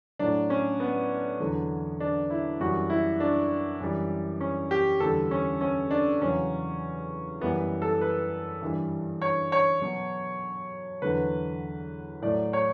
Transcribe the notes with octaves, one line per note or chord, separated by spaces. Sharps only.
A2 F#3 D4
C#4
B3
E2 D3 F#3
D4
E4
F#2 E3 G3 F#4
E4
D4
F#2 E3 G3
C#4
G4
E2 D3 G3 A4
C#4
C#4
D4
E2 C#3 F#3 C#4
F#2 E3 G3 B3
A4
B4
G2 E3 G3
C#5
C#5
B2 F#3
E2 D3 F#3 B4
A2 F#3 D5
C#5